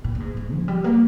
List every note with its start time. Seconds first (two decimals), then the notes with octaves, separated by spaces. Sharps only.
0.04 A#2
0.15 A#2
0.20 G#2
0.37 G#2
0.53 F3
0.68 G3
0.84 A#3